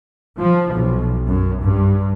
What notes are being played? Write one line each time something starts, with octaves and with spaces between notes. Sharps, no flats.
F3
B1
F#2
G2